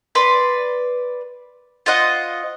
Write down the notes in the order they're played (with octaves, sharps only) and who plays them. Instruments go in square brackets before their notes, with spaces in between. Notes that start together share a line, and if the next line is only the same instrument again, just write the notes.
[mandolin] B4 D5 C6
F4 C5 D#5 F#5